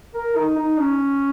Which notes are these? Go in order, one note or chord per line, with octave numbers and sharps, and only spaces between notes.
A#4
D#4
D#4
C#4